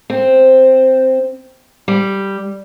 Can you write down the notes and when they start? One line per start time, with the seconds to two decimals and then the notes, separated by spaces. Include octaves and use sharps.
0.10 C4
1.88 G3